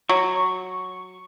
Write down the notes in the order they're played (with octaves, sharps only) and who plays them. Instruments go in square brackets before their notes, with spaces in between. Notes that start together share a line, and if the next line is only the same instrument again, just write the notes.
[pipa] F#3 [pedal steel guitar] C#6